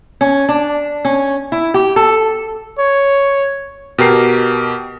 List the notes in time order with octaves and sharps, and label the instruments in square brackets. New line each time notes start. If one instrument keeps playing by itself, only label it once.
[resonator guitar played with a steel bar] C#4
D4
C#4
E4
G4
A4
[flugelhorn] C#5
[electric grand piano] B2 G4 A#4 C7